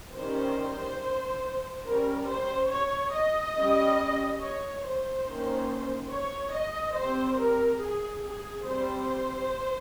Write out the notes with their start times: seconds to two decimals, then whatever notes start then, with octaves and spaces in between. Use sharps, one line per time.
0.16 D#3 G3 C#4 C5
1.86 G3 C#4 A#4
2.29 C5
2.71 C#5
3.13 D#5
3.56 G3 C#4
4.41 C#5
4.84 C5
5.26 D#3 A#3 C#4
6.11 C#5
6.54 D#5
6.96 G3 C4 C5
7.38 A#4
7.81 G#4
8.23 G#4
8.66 G3 C4 C5